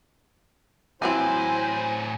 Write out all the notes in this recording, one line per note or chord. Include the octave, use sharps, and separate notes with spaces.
A2 E3 F#3 C4 E4 C5 G#5